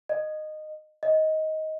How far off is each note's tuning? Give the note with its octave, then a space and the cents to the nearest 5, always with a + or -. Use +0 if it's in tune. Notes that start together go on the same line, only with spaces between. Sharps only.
D#5 -15
D#5 +15